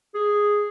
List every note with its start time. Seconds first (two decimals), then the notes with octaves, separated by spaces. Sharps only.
0.14 G#4